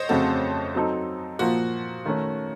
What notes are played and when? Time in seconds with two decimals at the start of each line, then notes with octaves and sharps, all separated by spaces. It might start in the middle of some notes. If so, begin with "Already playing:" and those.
Already playing: C5 C#5 D#5
0.09 F2 C#3 A3 C4 F#4 A4
0.75 F#3 C4 D#4 A4
1.39 A#2 F3 A#3 F#4
2.06 D#3 A3 C#4